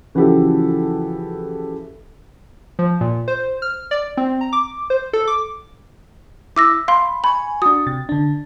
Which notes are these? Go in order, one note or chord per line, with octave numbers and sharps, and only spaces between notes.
C#3 E3 F3 F#4 G4 A4
F3
A#2
C5
F6
D5
C4
A#5
D6
C5
A4
D6
E4 D6 E6 A#6
F5 B5 C6
G#5 B5 C#6
D4 F#4 D#6
C3 A6
D3 D4